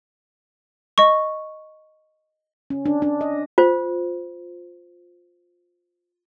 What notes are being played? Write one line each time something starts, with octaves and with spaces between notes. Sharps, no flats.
D#5 C#6
C#4
D4
D4
D#5
F4 C5